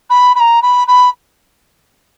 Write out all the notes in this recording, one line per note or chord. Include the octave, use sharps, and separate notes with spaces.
B5
B5
A#5
B5
B5